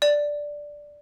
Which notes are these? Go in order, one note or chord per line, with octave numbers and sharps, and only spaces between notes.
D5